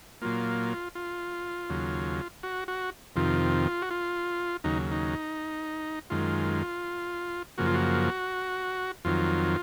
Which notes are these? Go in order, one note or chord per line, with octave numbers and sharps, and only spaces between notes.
A#2 F#3 A#3 F4
F4
D#2 C#3 F#3
F#4
F#4
F2 C3 D#3 F4
F#4
F4
D#2 C#3 F#3 D#4
D#4
F#2 D#3 G#3 F4
F#2 C#3 F3 A#3 F#4
F4
F#4
F2 D#3 F#3 F4